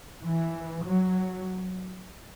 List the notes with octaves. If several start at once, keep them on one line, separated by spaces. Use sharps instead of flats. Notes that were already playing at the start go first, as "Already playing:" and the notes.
E3
F#3